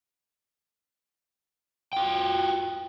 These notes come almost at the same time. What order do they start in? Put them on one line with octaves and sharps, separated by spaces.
G5 F4 F#4